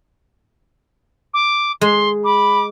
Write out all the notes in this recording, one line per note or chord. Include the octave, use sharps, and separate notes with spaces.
D6
G#3 C6
B5 D6